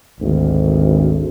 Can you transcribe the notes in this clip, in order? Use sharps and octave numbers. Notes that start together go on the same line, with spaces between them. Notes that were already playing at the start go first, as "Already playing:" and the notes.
G#1 D2